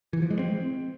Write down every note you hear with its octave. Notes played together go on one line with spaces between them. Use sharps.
E3
F3
G#3
C4